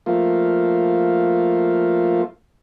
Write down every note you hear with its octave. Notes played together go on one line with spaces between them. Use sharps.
F3 A3 A#3 F4